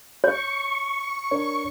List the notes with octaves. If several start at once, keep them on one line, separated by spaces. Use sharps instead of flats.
C#5 C#6
D4 A#4 C#5